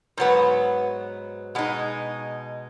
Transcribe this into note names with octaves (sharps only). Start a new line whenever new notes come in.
G#2 F#3 B3
B2 G#3 D#4